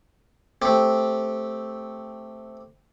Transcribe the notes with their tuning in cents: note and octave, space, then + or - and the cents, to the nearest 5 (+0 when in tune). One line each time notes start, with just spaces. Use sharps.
A3 +0 C4 +0 G4 +0